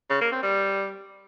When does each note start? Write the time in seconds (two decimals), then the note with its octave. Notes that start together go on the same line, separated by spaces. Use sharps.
0.10 C#3
0.21 A#3
0.32 C4
0.43 G3